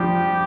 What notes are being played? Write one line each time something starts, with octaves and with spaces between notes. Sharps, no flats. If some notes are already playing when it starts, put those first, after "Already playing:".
Already playing: F3 G3 G4